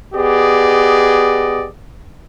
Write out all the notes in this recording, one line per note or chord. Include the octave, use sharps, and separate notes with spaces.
B3 G4 G#4 D5 D#5